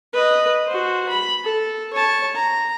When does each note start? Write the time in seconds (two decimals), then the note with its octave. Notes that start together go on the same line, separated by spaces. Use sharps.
0.13 B4 D#5
0.67 F#4 C5
1.09 B5
1.44 A4
1.93 C#5 A5
2.36 A#5